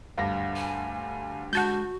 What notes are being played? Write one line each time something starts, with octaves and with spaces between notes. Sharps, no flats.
D2 G2 F5 A#6
G#5
G#3 F#4 F#5 A5 G6